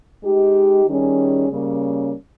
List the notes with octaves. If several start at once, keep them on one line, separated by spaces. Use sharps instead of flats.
G#3 D#4 G4
D#3 G3 C#4 G#4
C#3 G3 A#3 C#4